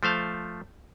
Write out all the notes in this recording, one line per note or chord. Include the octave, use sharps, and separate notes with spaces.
F3 A3 C5 F5